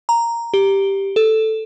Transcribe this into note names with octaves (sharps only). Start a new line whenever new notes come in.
A#5
G4
A4